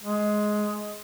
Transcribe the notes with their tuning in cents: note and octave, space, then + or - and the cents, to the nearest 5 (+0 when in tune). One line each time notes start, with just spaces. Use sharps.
G#3 +15